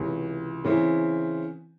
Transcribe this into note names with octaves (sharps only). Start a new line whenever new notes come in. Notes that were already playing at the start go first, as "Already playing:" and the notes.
Already playing: C#2 C3 E3
C#3 E3 C4 E4